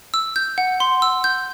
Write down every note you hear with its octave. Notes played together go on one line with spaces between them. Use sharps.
E6
G6
F#5
C6
E6
G6